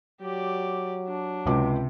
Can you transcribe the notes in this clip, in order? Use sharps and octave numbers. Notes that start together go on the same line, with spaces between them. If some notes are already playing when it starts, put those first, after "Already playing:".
F#3 G4 D5
D4
C#2 C3 D6